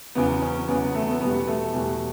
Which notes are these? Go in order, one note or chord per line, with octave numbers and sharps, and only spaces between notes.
E2 C#3 F#3 B3
C#4
E2 C#3 F#3 B3
B3
A3
B3
E2 B2 G3 B3
A3
E2 B2 G3